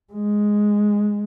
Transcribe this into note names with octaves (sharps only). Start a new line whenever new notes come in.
G#3